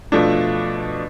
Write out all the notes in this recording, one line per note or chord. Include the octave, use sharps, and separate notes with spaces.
B2 F3 A3 D4